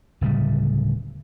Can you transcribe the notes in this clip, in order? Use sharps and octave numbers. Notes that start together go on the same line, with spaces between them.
D1 C#3 G3